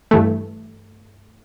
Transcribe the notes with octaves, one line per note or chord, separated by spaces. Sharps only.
G2 E3 A3